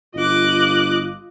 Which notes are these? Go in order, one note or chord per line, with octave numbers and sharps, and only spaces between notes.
G1 F4 D#5 D6 F#6